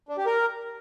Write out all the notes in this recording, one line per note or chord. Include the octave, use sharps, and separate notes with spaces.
D4
G4
A#4